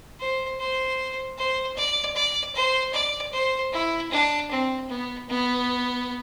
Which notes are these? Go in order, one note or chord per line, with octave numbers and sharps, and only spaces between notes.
C5
C5
C5
D5
D5
C5
D5
C5
E4
D4
C4
B3
B3